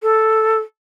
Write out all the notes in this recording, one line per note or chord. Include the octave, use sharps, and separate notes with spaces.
A4